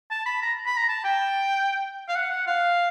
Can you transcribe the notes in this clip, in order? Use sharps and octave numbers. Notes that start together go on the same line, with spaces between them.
A5
B5
A#5
B5
A#5
A5
G5
F5
F#5
F#5
F5